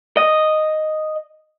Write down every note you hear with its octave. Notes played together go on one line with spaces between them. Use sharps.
D#5